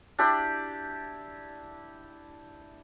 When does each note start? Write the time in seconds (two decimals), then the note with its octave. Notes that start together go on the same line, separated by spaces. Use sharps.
0.19 D4 E4 G4 D5